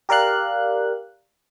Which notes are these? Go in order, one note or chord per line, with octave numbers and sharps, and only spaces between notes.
G4 A#4 D5 F5 F#6